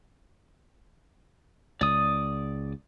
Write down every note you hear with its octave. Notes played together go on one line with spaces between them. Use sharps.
C#2 D5 D#6